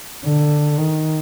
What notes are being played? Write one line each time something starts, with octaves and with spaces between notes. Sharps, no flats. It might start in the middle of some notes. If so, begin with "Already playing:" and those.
D3
D#3